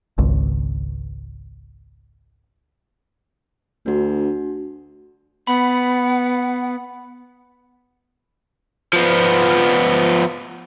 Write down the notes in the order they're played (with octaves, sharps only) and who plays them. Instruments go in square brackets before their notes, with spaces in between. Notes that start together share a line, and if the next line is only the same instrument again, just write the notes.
[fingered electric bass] G#1 C#2
[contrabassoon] D2 [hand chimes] D4 F#4
[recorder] B3 [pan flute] F#5 [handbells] B5
[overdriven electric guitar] F3 B3